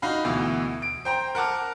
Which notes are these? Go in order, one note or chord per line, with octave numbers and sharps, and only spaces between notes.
D#4 F#4 F5 B5
D2 B2 E3
D7
C5 G5 A#5
A#4 F#5 A5 D6 F6